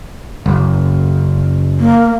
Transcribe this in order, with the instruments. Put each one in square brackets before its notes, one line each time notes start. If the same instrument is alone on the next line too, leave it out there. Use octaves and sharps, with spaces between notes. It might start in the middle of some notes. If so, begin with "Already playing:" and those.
[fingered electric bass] F#1
[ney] A#3